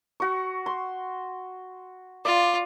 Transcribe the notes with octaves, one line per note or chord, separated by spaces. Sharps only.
F#4 C#6
C6
F4 D5